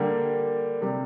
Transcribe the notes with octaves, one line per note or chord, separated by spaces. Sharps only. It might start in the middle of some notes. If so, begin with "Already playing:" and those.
Already playing: D3 G3 A#3
C3 G3